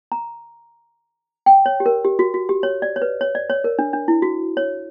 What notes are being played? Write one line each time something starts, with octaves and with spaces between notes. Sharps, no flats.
A#5
G5
C#5
G4
A#4
G4
F#4
F#4
G4
C#5
D5
C#5
B4
C#5
D5
C#5
A#4
D4
D4
E4
F#4
C#5